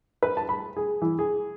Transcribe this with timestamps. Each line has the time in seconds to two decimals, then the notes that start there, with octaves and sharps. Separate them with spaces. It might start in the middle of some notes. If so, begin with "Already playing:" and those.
0.23 B4
0.37 A5
0.49 B5
0.77 G#4
1.02 E3
1.19 G#4